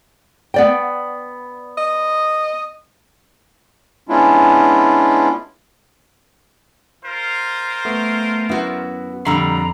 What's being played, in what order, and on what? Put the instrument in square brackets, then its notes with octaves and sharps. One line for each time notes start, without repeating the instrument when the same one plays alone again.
[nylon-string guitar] B3 D5 G5
[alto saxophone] D#5
[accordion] G#3 B3 C#4 D4 E4 F4
[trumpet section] F4 A#4 C5
[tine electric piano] A3 B3
[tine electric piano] F#2 B3 [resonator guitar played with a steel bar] E4 F#4
[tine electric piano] F2 B5 C7 [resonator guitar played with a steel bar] A#2 D3 G3 [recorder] A#5